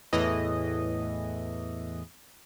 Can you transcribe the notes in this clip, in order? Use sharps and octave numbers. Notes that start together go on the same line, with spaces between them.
E2 A2 E3 D#5